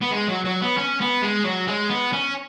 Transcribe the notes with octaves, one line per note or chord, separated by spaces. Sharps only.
B3
G#3
F#3
F#3
B3
C#4
B3
G#3
F#3
G#3
B3
C#4